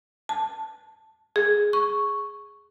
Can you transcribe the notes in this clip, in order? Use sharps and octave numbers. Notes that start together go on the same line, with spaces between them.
A5
G#4
C#6